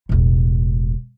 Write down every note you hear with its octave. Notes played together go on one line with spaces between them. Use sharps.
E1 A1